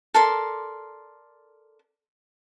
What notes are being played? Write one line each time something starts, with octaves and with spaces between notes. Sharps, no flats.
A4 A#4 D5 C6